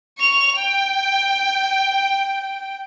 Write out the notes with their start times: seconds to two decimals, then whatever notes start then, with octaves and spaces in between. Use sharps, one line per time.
0.18 C#6 F7
0.56 G5